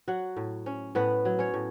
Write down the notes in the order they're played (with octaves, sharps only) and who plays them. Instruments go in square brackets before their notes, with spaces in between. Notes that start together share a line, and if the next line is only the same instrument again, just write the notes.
[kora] F#3 F#4 F#5
A2
C#4
A2 B3 B4
F#3
C#4 C#5
A2